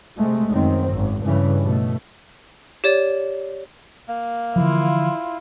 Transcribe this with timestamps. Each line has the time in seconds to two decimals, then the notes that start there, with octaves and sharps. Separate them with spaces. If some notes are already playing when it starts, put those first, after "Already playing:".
0.16 C3 G#3 A3
0.48 F#2 D#3 C4
0.91 G#1 F#2
1.22 G2 C#3 E3
1.62 B2 A3
2.84 G4 C#5 D5
4.08 A#3
4.56 D3 E3 F3 E4 F4